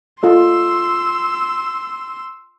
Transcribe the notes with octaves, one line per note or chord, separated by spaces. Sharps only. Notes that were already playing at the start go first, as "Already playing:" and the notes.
F4 A4 D#5 C6 E6